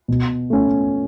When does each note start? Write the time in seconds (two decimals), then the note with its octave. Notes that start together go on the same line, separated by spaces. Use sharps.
0.08 B2
0.50 A3 C#4